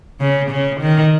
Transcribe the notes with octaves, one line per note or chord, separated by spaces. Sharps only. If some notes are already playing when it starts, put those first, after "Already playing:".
C#3
C#3
D#3